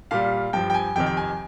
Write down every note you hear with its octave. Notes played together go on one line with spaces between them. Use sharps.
A#2 G3 F5
G2 F3 G5
G5
G#5
F2 C3 D#3 G5
G5
G#5